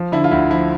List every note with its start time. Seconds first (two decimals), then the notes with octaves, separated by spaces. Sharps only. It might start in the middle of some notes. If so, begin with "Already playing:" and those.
Already playing: F3
0.12 D3 E4
0.24 F4
0.31 D2 E4
0.50 F3 E4